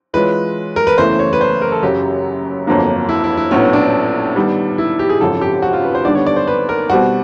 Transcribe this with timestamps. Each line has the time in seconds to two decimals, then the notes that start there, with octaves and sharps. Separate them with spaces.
0.13 E3 G#3 C#4 F4 B4
0.76 A#4
0.87 B4
0.98 F#1 E2 C#3 E3 A3 C5
1.19 C#5
1.33 B4
1.41 C5
1.61 A#4
1.72 A4
1.83 F#2 C#3 F#3 G4
2.67 G1 F2 D3 F#3 A#3
3.09 E4
3.24 E4
3.37 E4
3.51 A#1 A2 F#3 B3 C#4
3.73 D4
4.36 D#3 G3 B3
4.78 E4
4.99 G4
5.09 G#4
5.21 G#1 F#2 C#3 F3 A4
5.41 G4
5.62 F#4
5.73 F4
5.84 B4
5.95 C5
6.05 D#2 D3 G3 B3 D4 D5
6.15 C#5
6.26 D5
6.36 C5
6.47 B4
6.69 A#4
6.90 B2 G3 C4 F#4